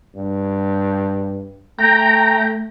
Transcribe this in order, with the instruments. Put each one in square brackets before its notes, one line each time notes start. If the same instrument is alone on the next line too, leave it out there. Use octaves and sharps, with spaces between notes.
[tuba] G2
[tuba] A3 [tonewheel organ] G5 A#5